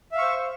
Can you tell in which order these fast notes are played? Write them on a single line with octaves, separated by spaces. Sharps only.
E5 F5 C#6 C5